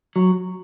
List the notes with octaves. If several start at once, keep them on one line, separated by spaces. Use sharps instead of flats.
F#3